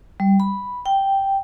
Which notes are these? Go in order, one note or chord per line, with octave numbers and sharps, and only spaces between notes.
G3
B5
G5